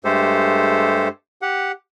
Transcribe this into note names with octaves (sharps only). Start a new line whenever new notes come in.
G2 G#3 A3 G4 A4 C5
G4 F#5